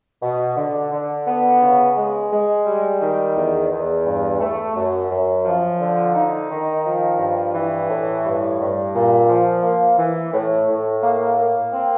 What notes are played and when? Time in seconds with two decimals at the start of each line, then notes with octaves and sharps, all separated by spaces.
0.23 B2
0.57 D3
0.93 D3
1.27 B3
1.61 C#3
1.97 G#3
2.32 G#3
2.66 G3
3.01 D#3
3.36 E2
3.71 E2
4.06 G2
4.41 A3
4.75 F#2
5.11 F#2
5.45 F3
5.80 D3
6.15 D#4
6.50 D#3
6.85 F3
7.19 G2
7.55 E3
7.90 A2
8.24 G2
8.60 G2
8.94 A#2
9.28 F3
9.63 A#3
9.98 E3
10.33 A2
10.68 A2
11.03 A#3
11.38 A#3
11.73 C4